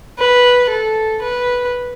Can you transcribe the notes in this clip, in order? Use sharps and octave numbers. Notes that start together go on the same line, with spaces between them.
B4
A4
B4